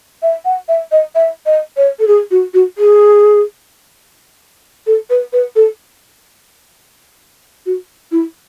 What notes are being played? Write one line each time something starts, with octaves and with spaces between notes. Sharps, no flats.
E5
F#5
E5
D#5
E5
D#5
C#5
A4
G#4
F#4
F#4
G#4
A4
B4
B4
A4
F#4
E4